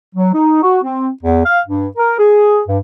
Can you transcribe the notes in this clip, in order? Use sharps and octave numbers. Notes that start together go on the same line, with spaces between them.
F#3
D#4
F#4
C4
E2
F5
G2
A#4
G#4
G2